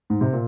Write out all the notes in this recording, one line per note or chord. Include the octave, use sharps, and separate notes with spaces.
G#2
C3
A#2